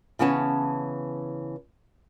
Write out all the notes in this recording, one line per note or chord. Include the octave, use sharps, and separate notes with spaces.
C#3 E3 B3 C#4 C#5 A5